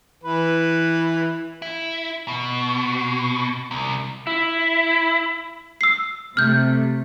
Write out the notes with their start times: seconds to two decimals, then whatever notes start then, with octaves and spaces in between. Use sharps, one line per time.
0.24 E3 B4
1.62 E4
2.28 B2
3.71 C2
4.27 E4
5.81 E6 C7
6.37 C3 A3 F6 G6